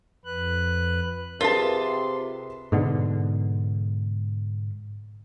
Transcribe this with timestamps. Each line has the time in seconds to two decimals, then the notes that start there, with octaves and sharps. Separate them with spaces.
0.25 F2 B4 F#6
1.41 C3 F4 G#4 A#4 B4 A5 C6
2.72 G#2 B2 D3